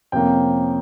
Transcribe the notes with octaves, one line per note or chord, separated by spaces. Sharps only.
F2 C3 F3 A#3 C#4 G5